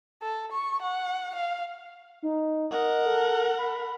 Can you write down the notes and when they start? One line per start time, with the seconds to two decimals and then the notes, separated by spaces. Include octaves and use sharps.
0.22 A4
0.52 C#6
0.83 F#5
1.35 F5
2.23 D#4
2.71 A#4 D#5 F#5
3.05 A4
3.58 B5